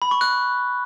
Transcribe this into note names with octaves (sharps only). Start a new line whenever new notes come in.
B5
C#6
F#6